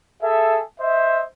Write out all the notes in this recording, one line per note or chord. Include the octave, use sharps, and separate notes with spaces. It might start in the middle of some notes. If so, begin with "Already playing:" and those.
G#4 A4 E5
C5 D#5 E5